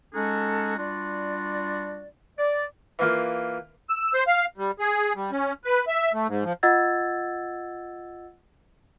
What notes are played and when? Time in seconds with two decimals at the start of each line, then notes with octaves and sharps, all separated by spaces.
0.13 G#3 C#4 D#4 F#4 G#4 A4
0.78 G3 D4 F4 F#4 D5
2.38 D5
2.99 E3 A#3 F4
3.89 E6
4.14 C5
4.27 F5
4.58 G3
4.79 G#4
5.15 G3
5.32 C#4
5.65 B4
5.87 E5
6.13 A3
6.28 G#2
6.44 F3
6.63 F4 D#5 F#5 E6 G#6 A6